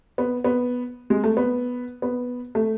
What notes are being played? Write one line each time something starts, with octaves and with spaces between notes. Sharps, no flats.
B3
B3
G#3
A3
B3
B3
A3